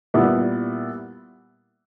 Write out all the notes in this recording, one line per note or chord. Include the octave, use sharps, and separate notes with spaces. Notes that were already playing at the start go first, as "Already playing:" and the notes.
A#2 G3 B3 E4